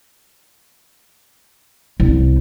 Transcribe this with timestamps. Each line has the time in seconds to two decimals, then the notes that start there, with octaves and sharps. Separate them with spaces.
2.00 C2